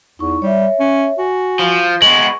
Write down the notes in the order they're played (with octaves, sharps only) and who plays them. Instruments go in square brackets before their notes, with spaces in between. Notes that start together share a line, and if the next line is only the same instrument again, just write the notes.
[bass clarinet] E2 [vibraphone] D#4 E4 C#6
[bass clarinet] G3 [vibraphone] C#5 E5
[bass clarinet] C#4
[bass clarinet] F#4 [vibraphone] G#5
[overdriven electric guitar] F3
[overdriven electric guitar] G#3 B3 [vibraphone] C#6 [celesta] F#7